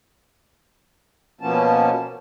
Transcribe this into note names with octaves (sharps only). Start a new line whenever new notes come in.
B2 F3 A#3 B3 C#4 A5